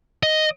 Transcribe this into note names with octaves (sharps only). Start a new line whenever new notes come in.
D#5